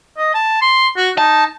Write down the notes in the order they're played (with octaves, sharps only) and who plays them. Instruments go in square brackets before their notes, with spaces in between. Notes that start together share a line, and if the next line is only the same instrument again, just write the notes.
[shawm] D#5
A5
C6
F#4
[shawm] D#4 [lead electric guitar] A5